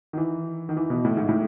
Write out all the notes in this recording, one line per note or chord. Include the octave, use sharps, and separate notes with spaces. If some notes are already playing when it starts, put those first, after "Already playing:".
D#3
E3
D#3
E3
B2
A2
G#2
A2